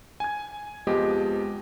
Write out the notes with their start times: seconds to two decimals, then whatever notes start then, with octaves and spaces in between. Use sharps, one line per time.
0.20 G#5 G#6
0.87 F2 F3 G#3 B3 G4 D#5